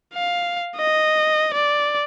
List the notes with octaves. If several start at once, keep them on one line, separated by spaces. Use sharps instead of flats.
F5
D#5
D5